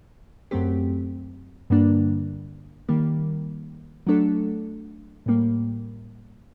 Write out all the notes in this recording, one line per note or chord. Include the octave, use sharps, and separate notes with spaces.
F#2 F#3 A3 C4 G4
G2 D3 G3 A#3 D4
D#3 G3 A#3
F#3 A3 D4 A4
A2 G3 A#3